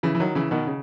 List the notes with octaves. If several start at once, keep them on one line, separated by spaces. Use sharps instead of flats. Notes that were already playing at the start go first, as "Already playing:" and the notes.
C#3 E3
E3
D#3 F#3
C#3 E3
B2 D#3
C#3